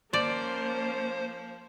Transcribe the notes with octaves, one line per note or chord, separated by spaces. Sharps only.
F3 A#3 C#4 C5 D5